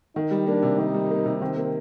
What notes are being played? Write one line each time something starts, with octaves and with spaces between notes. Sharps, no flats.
D#3 D#4
G3
A#3 D4
C3
D#3 D#4
G3
A#3
C3
D#3 C4
A#3